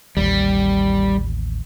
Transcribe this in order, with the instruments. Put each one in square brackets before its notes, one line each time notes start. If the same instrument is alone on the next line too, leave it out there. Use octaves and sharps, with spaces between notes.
[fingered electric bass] A1 D#2 [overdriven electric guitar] G3